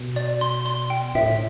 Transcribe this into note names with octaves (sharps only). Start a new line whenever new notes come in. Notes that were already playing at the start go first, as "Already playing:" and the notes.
Already playing: B2
D5
C6
C6
G5
A2 E5